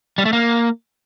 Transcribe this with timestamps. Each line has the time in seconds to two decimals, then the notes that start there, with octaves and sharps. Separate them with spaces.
0.18 G3
0.25 A3
0.33 A#3